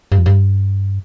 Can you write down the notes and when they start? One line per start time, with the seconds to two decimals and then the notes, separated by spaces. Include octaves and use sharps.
0.12 G2
0.18 F2
0.26 G2